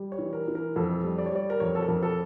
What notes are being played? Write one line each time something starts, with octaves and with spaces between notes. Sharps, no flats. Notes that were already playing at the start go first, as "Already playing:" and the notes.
Already playing: G3
C#5
E3
A#4
E3
A#4
F2 A4
G3
D5
C#5
G3 D5
A#4
F2 C#5
A4
A#4
F2
A4